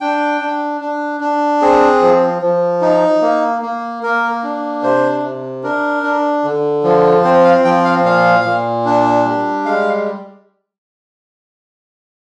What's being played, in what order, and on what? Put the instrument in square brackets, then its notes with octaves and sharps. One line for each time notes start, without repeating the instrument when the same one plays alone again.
[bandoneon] D4 G5
D4
D4
D4
C4 G#4
F3
F3
D#4
A#3
A#3
A#3 A#4
D4
C3 C5
C3
D4 A#4
D4
D3
F3
C4 C5
F5
F3 G5
F5
A#2 F5
A#2
D4
G3
G#3 F5